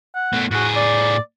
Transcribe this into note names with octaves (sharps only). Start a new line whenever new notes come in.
F#5
B2 A3
A2 F#4 G#4
D5